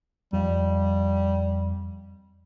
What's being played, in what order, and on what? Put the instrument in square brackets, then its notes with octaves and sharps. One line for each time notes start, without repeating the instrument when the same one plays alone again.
[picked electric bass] F2 [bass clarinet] G3